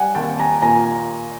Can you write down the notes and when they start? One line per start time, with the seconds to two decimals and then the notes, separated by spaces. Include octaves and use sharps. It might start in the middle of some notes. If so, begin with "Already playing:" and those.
Already playing: G3 F#5 G#5
0.15 D#2 G5 A5
0.39 G#5 A#5
0.62 A#2 G#5 A#5